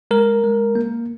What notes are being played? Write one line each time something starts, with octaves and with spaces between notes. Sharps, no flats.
G#3 A#4
G#3
A#3